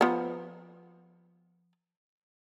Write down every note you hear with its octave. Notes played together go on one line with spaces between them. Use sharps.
F3 B3